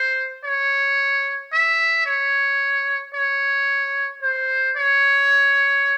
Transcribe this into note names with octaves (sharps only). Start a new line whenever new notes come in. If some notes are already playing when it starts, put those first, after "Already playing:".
Already playing: C5
C#5
E5
C#5
C#5
C5
C#5